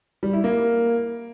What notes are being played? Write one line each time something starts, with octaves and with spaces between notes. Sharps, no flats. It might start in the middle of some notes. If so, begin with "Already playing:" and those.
G3
E4
A#3